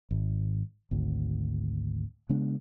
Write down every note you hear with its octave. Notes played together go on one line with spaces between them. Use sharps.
G#1
G#1 D2
C#3 G#3 B3 D4